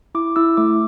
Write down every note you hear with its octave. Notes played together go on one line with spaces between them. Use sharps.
E4 D6
E4 E6
A3 D6